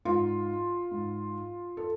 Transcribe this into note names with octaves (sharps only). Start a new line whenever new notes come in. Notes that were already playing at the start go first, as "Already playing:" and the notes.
G#2 F4
G#2
A4